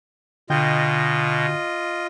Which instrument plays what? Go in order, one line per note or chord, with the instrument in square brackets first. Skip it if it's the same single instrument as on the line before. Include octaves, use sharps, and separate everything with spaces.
[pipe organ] B2 [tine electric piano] D3 G5 G6 [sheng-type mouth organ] F4 D#5